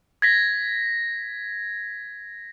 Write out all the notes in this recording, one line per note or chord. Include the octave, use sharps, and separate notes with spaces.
G#6 A#6 B6